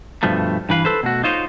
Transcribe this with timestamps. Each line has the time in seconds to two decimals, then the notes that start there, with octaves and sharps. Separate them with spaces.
0.23 G2 B2 F3 A3
0.69 G2 E3 B4 F5
0.85 A4 B4 C5
1.03 B2 A3 F#4
1.24 D#4 F4 C5 C#5 D#5